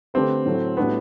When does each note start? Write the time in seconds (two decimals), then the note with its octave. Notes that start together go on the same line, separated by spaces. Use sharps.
0.14 D3 A3 C4 D4 G4 B4
0.46 A2 F#3 A3
0.77 A2 G3 B3 D4 F#4